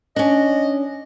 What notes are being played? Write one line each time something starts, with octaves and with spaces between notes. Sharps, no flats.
C#4 D4 D#5